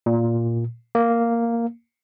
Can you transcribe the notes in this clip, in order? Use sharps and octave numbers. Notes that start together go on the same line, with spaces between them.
A#2
A#3